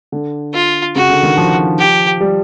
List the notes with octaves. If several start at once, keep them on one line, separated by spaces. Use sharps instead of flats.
D3
F4
C#3 F#4
D3
D#3
F3
G4
G3